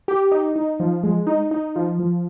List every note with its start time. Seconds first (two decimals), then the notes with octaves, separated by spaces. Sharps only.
0.08 G4
0.32 D#4
0.56 D#4
0.80 F3
1.03 G#3
1.27 D#4
1.51 D#4
1.76 F3
1.99 F3